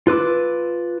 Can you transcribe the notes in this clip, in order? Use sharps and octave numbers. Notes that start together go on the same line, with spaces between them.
F4 B4 D6 E6